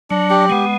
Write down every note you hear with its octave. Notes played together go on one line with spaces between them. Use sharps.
F#3 D4
G4
G#3 B3